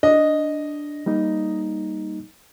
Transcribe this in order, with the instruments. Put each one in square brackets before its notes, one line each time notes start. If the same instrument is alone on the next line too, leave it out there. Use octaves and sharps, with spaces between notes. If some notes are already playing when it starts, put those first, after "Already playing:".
[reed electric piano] D4 [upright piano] D#5
[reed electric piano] G3 A#3 D#4